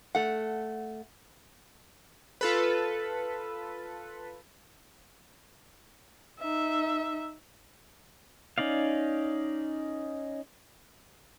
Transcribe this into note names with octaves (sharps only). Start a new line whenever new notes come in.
A3 F#5
F4 A4 B4
D#4 E5
C#4 D#4 D5 F5